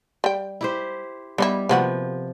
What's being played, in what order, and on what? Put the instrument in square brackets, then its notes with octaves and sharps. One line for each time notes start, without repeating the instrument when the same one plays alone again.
[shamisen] G3 G5
[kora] E4 G4 C5
[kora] G3 [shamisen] B3 D#4 E4
[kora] C3 F3 [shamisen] A#3 B3 F#4